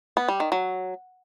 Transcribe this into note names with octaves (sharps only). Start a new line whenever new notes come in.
B3
G3
D#3
F#3